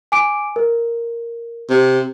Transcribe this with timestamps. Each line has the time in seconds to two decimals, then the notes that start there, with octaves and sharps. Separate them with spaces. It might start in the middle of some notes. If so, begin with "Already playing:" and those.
0.12 G#5 D6 D7
0.56 A#4
1.70 C3